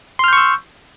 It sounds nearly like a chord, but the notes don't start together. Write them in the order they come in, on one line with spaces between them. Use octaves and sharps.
C6 F6 G6 C#6 E6